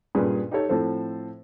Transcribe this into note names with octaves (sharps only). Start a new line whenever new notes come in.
G2 A#2 C#4 G#4 B4
D#4 G4 A4 C#5
A2 F3 C4 A4 C5